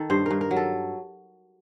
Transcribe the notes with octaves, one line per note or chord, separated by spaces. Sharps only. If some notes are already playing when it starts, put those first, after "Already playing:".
Already playing: D#3 A4
G2 C5
G2 A#4
A#4
F#3
A4